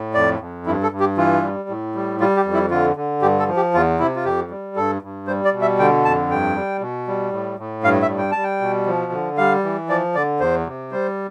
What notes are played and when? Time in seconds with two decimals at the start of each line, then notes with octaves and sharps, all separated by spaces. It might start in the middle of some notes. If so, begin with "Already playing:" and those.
Already playing: A2
0.14 F2 D5
0.40 F2
0.66 G2 E4
0.83 A4
0.92 G2
1.00 G4
1.17 E3 F4
1.42 G3
1.69 A2
1.95 G3
2.20 G3 F4
2.37 G4
2.45 F2
2.54 E4
2.71 D3 F4
2.96 D3
3.22 G2 G4
3.39 A4
3.48 F3
3.56 G4
3.74 E2 F4
3.99 C3 E4
4.16 F4
4.24 F2 G4
4.50 G3
4.76 G2 A4
5.02 G2
5.27 G3 C5
5.45 D5
5.53 B2
5.61 E5
5.79 D3 G5
6.05 F2 A5
6.30 G2 G5
6.55 G3
6.81 B2
7.07 G3
7.32 A2
7.59 A2
7.84 G2 F5
8.02 E5
8.10 G3
8.18 G5
8.31 G3 A5
8.43 G5
8.61 B2
8.86 F3
9.12 D3
9.37 G3 F5
9.64 E3
9.89 F3 D5
10.15 D3 D5
10.40 E2 C5
10.67 C3
10.92 G3 C5